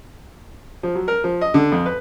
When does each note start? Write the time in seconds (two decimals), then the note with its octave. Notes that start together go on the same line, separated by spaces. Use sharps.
0.83 F3
0.95 F#3
1.08 A#4
1.24 F3
1.41 D#5
1.54 D3
1.72 F2
1.86 B4